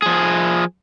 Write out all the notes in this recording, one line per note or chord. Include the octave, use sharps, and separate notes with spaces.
F3 G#4